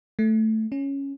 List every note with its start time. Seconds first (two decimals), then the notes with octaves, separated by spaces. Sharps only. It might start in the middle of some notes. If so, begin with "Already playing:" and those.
0.19 A3
0.72 C#4